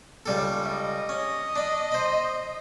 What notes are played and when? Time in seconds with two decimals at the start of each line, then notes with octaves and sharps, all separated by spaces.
0.26 C#2 G3 A4
0.66 D#5
1.09 C#4
1.56 D4 B5
1.92 C5 B5